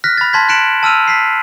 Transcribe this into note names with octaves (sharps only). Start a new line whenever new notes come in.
F6 F#6 A#6 B6
B5 A6
A5 C6 G#6 B6
F#6 B6 C#7 D7 E7 F#7
A5 E6 F6 D#7 F7
B6 C7